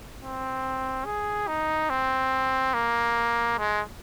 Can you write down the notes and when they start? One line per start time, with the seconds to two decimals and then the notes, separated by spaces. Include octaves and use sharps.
0.21 C4
1.05 G#4
1.48 D#4
1.90 C4
2.74 A#3
3.59 G#3